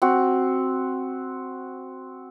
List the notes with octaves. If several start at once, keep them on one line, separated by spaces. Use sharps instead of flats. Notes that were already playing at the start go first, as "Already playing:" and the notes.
C4 F#4